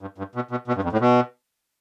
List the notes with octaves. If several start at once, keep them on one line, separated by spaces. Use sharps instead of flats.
G2
G2
B2
B2
B2
G2
F2
A2
B2